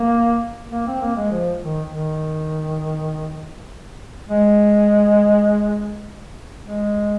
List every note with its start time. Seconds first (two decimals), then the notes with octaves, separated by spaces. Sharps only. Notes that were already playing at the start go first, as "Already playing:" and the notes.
Already playing: A#3
0.72 A#3
0.87 C4
1.02 A#3
1.16 G#3
1.31 F3
1.61 D#3
1.91 D#3
4.29 G#3
6.67 G#3